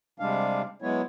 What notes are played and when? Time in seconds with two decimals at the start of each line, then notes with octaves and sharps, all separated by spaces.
0.20 C3 G3 G#3 D4 F5
0.82 F#3 G#3 B3 E4 C#5